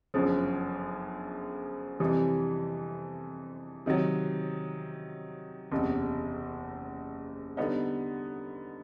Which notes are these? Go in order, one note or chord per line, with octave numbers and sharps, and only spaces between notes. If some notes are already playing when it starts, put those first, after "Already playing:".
G1 F#2 C#3 F3
F2 C3 E3 G3
C3 D#3 F#3
F#1 E2 C3
D3 G3 B3 D#4